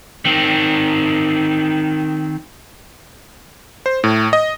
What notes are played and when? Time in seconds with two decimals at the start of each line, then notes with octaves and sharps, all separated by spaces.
0.25 D#3 C4
3.86 C5
4.04 A2
4.33 D#5